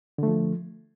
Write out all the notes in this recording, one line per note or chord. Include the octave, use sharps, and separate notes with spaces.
D3 F3 A3